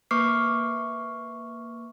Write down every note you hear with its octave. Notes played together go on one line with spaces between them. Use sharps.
A#3 B4 C#6 D6 F6 C7